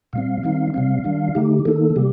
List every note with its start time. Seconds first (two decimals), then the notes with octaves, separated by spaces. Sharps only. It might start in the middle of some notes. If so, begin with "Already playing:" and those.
0.13 A#2 G3 C4 F5
0.43 D#3 G3 C4 D#4
0.74 C3 G3 C4 F5
1.04 D#3 G3 D4
1.35 D3 A3 D#4 G4
1.65 D#3 A#3 D#4 A4
1.96 C3 G3 A#3 G4